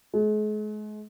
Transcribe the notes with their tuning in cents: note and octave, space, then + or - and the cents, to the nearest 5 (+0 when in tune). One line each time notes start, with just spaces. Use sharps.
G#3 +40